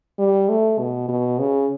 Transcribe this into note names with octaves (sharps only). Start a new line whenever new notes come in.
G3
A3
B2
B2
C#3